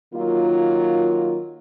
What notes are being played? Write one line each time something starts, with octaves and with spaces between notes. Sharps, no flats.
D#3 F#3 A#3 F4